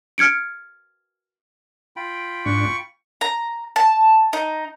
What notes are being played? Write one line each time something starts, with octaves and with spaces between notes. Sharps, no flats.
F6 G#6 C#7 D7
F4 G5 B5
G#2 D4 C#6
A#5
A5
D#4